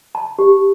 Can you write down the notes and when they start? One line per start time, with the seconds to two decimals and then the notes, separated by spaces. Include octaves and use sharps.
0.15 A5
0.39 G4